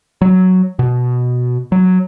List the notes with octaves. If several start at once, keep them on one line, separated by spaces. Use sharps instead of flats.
F#3
B2
F#3